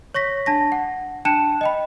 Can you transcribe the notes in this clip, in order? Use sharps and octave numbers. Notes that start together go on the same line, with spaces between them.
C#5 C#6 A#6 B6
D4 A5 A#6
F#5
D4 G5 A5 F#6 C#7 E7
D#5 G5 B5